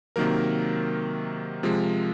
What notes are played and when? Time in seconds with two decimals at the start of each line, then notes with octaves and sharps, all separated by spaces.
0.16 C3 D#3 F#3 A#3 A#4
1.63 C3 F3 G#3